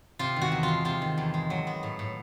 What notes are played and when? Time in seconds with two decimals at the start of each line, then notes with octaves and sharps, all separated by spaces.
0.19 C3 F4
0.36 D#3
0.42 F#4
0.52 E2
0.63 F4
0.68 G#3
0.85 C3 F4
1.02 D#3
1.18 E2
1.34 G#3
1.50 F#3
1.67 B3
1.83 A2
1.99 A2